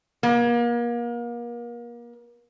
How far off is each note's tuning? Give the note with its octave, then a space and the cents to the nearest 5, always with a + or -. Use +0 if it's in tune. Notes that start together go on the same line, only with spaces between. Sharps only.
A#3 +35